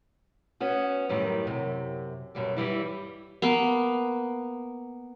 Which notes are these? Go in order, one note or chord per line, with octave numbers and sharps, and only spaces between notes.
B3 C#4 F#4
F#2 A2 D#3 G3
F#2 C3
F#2 B2 G3
G2 E3 G3 E4
A#3 B3